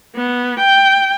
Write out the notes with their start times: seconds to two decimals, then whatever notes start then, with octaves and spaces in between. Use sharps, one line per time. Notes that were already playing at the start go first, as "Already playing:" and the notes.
0.16 B3
0.59 G5